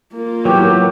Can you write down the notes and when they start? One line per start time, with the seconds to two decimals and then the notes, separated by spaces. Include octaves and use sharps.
0.14 A#3 F4
0.45 A2 E3 F#3 B3 F#4 G4